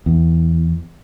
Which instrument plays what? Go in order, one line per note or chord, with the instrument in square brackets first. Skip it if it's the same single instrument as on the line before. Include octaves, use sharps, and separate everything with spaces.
[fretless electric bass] E2